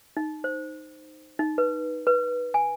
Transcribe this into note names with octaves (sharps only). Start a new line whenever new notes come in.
D#4
C5
D#4
B4
B4
G#5